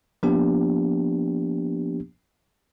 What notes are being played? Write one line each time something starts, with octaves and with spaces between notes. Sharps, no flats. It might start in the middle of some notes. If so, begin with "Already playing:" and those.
F3 A#3 B3 D4 G4